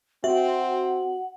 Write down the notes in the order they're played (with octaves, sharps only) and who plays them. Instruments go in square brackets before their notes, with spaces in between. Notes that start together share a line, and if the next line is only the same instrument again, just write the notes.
[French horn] C4 [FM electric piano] F#4 [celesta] E5 [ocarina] F#5